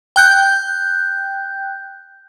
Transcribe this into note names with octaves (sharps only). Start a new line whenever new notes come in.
G5 F#6 G6